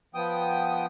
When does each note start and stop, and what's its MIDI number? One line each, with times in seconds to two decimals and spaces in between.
0.15 0.86 53
0.15 0.86 59
0.15 0.86 79
0.15 0.86 87